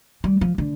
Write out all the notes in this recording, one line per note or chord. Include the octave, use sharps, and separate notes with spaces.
G3
F3
D3